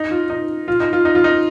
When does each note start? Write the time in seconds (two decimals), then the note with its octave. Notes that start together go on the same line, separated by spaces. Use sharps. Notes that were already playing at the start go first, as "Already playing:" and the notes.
Already playing: D#4
0.11 F4
0.30 D#4
0.68 F4
0.80 D#4
0.93 F4
1.05 D#4
1.15 F4
1.24 D#4